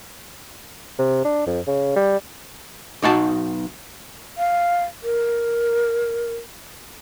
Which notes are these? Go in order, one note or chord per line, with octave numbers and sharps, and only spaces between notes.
C3
D4
F2
C#3
G3
B1 D#4 F#4 A5
F5
A#4